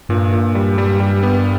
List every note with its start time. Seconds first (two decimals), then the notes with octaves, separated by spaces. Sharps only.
0.09 G2 A#2
0.33 A#2
0.55 G3
0.78 G3
1.00 G3
1.23 B3